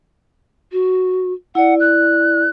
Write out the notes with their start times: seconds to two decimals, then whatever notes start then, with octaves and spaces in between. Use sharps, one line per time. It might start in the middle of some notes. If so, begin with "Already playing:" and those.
0.72 F#4
1.55 E4 D5 F#5
1.80 F#6